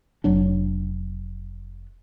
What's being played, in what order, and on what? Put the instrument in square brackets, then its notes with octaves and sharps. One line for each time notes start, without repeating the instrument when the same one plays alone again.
[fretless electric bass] F1 F#3 D4